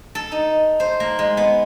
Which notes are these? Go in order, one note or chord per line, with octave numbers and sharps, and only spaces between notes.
A4
D#4
C5
A#3
G#3
B3